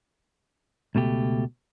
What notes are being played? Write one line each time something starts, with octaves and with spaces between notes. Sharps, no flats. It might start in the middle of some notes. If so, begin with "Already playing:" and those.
C#2 B2 A3 G4